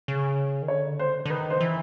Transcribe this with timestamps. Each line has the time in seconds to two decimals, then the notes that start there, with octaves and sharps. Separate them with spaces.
0.08 C#3
0.62 D#3
0.68 D3 C#5
0.99 C5
1.26 D3
1.30 D#3 B4
1.50 C5
1.61 E3